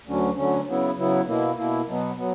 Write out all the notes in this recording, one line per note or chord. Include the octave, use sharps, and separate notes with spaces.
D2 D3 F#3 C#4
D2 D3 F#3 C#4
C#3 F#3 B3 E4
C#3 F#3 B3 E4
B2 A#3 E4
B2 A#3 E4
B2 F#3 B3
F#3 B3